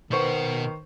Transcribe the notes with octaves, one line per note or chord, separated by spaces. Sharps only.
B2 D#3 B4 C5 F#5 C#6